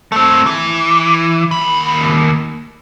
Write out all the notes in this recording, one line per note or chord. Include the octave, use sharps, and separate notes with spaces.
A3 C4
E3
D#2 B5